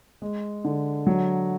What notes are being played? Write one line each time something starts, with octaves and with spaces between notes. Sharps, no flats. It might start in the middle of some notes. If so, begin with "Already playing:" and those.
G#3
D3
F#3